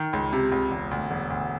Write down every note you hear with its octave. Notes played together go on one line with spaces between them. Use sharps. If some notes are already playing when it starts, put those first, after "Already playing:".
Already playing: D#3
C#2
C3
C#2
E1
D2
E1
D2